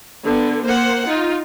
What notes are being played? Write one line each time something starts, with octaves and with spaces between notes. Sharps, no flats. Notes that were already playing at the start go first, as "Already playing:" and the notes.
D3 B3
A#3 C5 F#5
D#4 F4